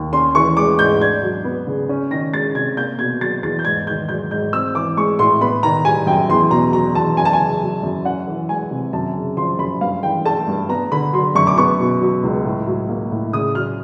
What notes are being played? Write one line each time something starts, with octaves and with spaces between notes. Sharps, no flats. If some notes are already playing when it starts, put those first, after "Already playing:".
Already playing: D#2
C#4 C6
E3 C#6
G#3 D6
G#2 G6
D4 G#6
F#3
B3
C#3
C#4
D#3 A#6
G#3 A6
C3 G#6
A#3 G6
B2 G#6
F#3 A6
E2 A6
G6
G#2 G#6
D#3 G6
F#3 G6
G#2 G6
C4 E6
E3 D6
G#3 C#6
A2 C6
B3 B5
D#3 A#5
G3 G#5
F#2 G5
E2 C6
B2 A#5
F#3 A#5
E2 A5
F#2 G#5
A5
G#5
C#3
F#3
F#2
C#4 F#5
E3
G#3 G#5
C3
F#2 A5
C#3
F3 C6
F#2 B5
G2 F5
E3 G5
A3 A5
G2
B3 A#5
D3 B5
F#3 C6
F#2 C#6
D6
B3 C#6
B2
F#3
C#2
A2
F#3
A#3
A2
C#3 D#6
F#3 F6